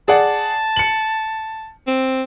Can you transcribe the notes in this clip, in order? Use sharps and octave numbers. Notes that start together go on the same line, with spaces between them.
G#4 D5 F#5 A5
C#7 F#7
C4